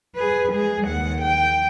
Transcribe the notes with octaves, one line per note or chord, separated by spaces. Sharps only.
G#4 B4
G#3 G#4
D#2 F#5
G5